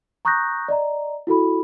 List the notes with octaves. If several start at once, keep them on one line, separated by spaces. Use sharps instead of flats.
A#5 C#6 D#6 F#6 G6 A#6
D5 D#5 A#5
E4 F#4 A4 B5